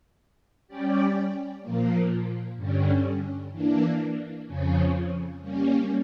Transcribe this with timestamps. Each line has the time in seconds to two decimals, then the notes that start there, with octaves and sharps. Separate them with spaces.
0.68 G3 C#4 G4 D5
1.62 A#2 F3 A#3
2.56 G2 D3 G3 C#4
3.51 E3 A#3 D4
4.46 F2 C#3 F3 C#4
5.41 G3 A#3 C#4